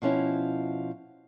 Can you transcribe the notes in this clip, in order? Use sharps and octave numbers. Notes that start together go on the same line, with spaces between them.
B2 F3 C#4 E4